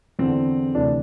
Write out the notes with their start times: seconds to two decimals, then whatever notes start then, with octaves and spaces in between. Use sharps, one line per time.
0.19 E2 D3 C4
0.74 D2 C3 E3 D4